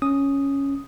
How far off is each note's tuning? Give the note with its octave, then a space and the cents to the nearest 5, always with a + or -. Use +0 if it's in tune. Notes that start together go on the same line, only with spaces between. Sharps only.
C#4 +0 D#6 +0